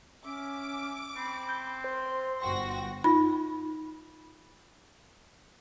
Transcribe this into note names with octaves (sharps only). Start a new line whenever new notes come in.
C#4 E5 D6
C4 B5
G6
C5 C6
G1 F#4 G5 C6 A#6
D#4 F4 B5